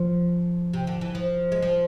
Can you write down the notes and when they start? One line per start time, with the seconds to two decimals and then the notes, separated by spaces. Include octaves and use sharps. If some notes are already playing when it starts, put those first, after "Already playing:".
Already playing: F3
0.73 C3
0.87 D3
1.01 E3
1.15 F3
1.52 G#3
1.62 F3